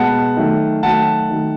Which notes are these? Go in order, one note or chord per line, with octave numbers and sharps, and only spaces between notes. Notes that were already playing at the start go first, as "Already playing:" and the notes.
Already playing: B2 G#3 B3 F#5 A5
D#3 F#3 A3
D#3 F#3 A3 F#5 A5
D#3 F#3 A3